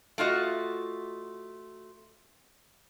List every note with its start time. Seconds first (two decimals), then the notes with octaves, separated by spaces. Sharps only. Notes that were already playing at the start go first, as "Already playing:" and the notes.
0.18 A3 F4 F#4 D#5